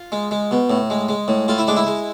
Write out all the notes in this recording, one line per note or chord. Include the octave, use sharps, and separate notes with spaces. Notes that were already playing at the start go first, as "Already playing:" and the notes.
Already playing: F4
G#3
G#3
B2
A2
G#3
G#3
A2
A2 F4
E4
G#3 D4
E4
G#3